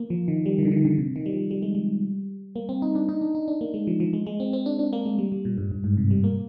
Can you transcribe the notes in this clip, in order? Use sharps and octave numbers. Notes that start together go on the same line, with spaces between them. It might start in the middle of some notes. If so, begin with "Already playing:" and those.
Already playing: A#3
F3
D#3
G3
D#3
D3
D#3
D3
C3
D#3
G3
F3
G3
G#3
G3
A#3
C4
D#4
D4
D#4
D4
D#4
D4
A#3
G#3
F3
F3
G#3
G#3
C4
C4
D4
D4
A#3
G#3
G3
G3
A#2
G2
G2
G#2
C3
G3
A#3